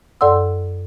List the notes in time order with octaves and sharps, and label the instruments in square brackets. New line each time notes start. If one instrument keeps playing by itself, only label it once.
[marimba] F#2 A4 D5 F#5 C6 E6